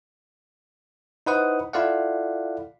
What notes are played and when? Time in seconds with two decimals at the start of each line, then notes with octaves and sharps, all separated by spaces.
1.26 D#4 E4 B4 C5 F#5 D#6
1.73 E4 F4 A4 D5 F5 F#5